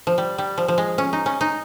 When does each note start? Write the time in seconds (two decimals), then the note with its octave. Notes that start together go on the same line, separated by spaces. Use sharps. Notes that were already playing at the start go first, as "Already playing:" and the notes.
0.07 F3
0.18 G3
0.38 G3
0.58 F3
0.68 F3
0.78 G#3
0.98 C#4
1.13 D#4
1.26 C#4
1.41 D#4